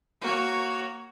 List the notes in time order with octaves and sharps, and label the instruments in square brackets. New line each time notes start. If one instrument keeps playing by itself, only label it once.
[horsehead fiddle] A#3 C#5 [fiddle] F#4